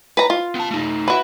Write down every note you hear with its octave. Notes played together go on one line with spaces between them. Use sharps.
B4 A#5
F4
B3 A5
A3 D#4
E4 F#4 B4